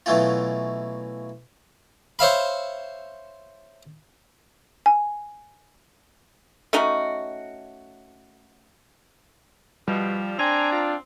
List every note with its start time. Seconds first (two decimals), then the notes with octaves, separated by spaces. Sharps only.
0.06 B2 E3 F#3 A3 C#4 F4
2.19 C5 C#5 E5 F5 B5
4.86 G#5
6.73 A3 C#4 D#4 F#4
9.88 B2 F3 G3
10.39 C4 D4 G#5 A#5
10.72 F4